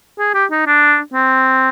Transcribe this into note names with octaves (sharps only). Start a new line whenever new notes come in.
G#4
G4
D#4
D4
C4